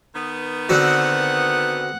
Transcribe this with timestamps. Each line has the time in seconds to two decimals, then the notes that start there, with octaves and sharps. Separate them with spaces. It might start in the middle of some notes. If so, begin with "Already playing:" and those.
0.15 D#3 B3
0.69 D3 C4 F#4 F#5